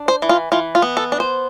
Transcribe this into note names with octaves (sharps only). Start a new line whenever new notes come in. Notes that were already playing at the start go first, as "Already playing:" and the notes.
Already playing: D4
C5
E3
F4
E3 F4
F4
B3
A4
D4
C5